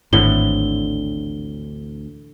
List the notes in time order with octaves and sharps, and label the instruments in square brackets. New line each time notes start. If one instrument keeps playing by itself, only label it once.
[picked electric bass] G#1 [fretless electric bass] D2 C4 [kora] A2 D3 E3 [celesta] G7